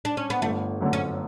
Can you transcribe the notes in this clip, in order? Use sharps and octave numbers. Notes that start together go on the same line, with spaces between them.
D4
C#4
B3
G1 A3
F#2 D3 A3
C#4